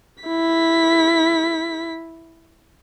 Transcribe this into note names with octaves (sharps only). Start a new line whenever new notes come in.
E4 B6